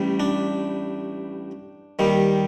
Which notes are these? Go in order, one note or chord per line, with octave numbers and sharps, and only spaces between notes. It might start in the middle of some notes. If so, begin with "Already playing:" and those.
Already playing: A1 A2 G3
D4
D#2 D#3 G3